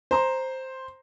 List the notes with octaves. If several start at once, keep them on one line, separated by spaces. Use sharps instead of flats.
C5 A#5 C6